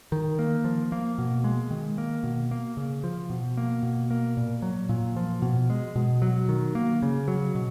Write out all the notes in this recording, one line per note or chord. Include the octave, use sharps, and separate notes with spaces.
D#3
A#3
F3
A#3
B2
G#3
D#3
A#3
B2
A#3
C#3
F3
B2
A#3
B2
A#3
A#2
F#3
A#2
F3
B2
G#3
B2
F#3
D#3
A#3
C#3
F#3
B2